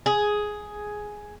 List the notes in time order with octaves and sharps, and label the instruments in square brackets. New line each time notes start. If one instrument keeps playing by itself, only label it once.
[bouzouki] G#4